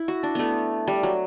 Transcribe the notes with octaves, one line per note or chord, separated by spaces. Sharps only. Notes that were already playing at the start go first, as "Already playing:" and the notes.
Already playing: E4
F#4
D4
A3 B3
G3
F#3